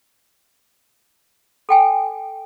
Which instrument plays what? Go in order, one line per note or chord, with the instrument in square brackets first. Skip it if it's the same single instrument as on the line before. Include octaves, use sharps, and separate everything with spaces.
[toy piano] A4 G5 G#5